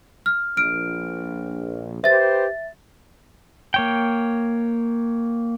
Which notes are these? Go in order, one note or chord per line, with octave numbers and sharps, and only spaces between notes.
F6
A#1 F6 D7
G4 B4 C5 E5 A6
A#3 C#5 G5